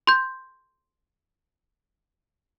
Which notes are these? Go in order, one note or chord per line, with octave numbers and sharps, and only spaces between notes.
C6 G6